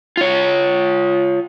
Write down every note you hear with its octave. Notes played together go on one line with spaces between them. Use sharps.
F4 C#5